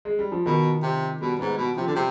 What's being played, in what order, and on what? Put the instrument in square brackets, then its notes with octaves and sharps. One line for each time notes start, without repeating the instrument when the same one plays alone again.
[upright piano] G#3
G3
F3
[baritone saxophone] B2 [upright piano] D#3
[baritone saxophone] C3
[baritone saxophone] B2 [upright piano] G3
[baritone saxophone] G#2 [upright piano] B3
[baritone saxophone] B2
[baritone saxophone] C3 [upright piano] F3
[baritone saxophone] D3
[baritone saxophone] C3 [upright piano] G3